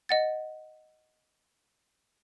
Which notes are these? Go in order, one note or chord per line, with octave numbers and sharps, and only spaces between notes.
D#5 F#5 A6